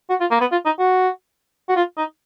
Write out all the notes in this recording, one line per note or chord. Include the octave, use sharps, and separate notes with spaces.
F#4
F4
A#3
B3
F4
D#4
F#4
F#4
F4
D#4